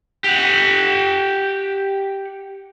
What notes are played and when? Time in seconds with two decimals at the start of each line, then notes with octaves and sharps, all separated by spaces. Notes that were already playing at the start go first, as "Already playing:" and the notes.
0.24 G4 F#5